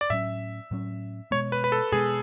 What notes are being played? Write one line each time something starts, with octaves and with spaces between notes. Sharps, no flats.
D5
A2 F#3 C#4 E5
A2 F#3 C#4
B2 G#3 B3 C#5
B4
B4
A4
B2 G#3 B3 G#4